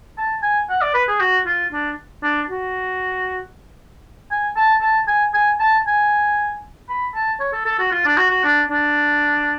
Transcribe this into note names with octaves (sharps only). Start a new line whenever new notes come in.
A5
G#5
F#5
D5
B4
G#4
F#4
F4
D4
D4
F#4
G#5
A5
A5
G#5
G#5
A5
G#5
B5
A5
C#5
A4
A4
F#4
F4
D4
F#4
F#4
D4
D4